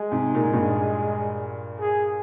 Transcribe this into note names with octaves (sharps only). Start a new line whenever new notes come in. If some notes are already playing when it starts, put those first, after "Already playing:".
Already playing: G#3
G#2 C3
A#2
G#2
G2 A#2
G#4